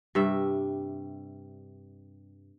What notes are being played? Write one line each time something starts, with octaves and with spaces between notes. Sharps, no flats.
G2 C3 G3 E5